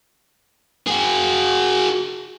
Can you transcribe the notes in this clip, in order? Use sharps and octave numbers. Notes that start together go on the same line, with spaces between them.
F#4 G#4